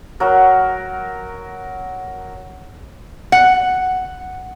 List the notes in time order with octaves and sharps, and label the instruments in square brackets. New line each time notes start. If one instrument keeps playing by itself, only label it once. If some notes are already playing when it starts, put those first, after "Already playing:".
[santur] F#3 A#4
[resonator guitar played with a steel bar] F#5